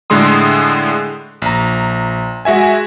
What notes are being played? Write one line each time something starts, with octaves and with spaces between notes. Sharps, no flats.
A2 D3 G#3 C6 D#6
A#1 A#5
G#3 F#4 E5 G#5